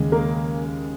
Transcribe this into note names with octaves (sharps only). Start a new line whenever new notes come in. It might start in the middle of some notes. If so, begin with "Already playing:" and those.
Already playing: D#2 C#3 G#3
A#3 A#4